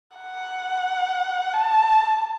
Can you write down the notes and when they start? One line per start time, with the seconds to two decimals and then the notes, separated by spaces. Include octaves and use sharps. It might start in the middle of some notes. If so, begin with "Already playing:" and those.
0.17 F#5
1.54 A5